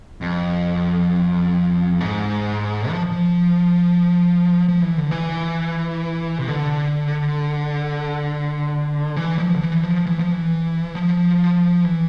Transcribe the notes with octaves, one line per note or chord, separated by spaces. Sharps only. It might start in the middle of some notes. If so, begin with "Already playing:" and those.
F2
G#2
F3
F3
F3
E3
D3
E3
C3
D3
E3
F3
D3
E3
F3
E3
F3
E3
F3
E3